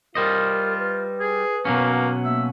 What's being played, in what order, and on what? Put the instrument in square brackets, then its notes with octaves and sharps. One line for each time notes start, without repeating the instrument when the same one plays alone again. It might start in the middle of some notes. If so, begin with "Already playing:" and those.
[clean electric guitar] G3 C5 D#5 [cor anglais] F4 [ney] A#4
[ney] B4
[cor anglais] G#4
[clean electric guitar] B2 F#3 C#4 [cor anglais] A#3
[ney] A#3 [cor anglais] E5